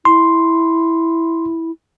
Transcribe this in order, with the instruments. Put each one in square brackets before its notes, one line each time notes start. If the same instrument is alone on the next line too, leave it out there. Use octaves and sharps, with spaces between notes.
[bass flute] E4 [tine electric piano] C6